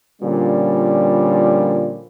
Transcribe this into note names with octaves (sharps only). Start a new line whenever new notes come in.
A#2 D3 F3 G3 C#4